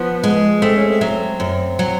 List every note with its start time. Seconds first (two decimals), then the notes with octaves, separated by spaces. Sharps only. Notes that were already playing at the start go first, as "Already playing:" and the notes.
Already playing: F3 B3
0.24 G#3
0.62 A3 C4
0.76 C#4
0.89 C4
1.01 F#3
1.40 F#2
1.79 F#3